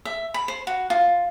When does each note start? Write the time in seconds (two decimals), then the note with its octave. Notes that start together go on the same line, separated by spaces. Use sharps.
0.05 E5
0.34 B5
0.48 C5
0.67 F#4
0.90 F4